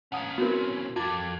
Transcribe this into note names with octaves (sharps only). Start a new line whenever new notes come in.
B1 C#4 F5 F#5 D#6
B3 C4 E4 F#4 A#4
F2 F4 D6 G#6 A6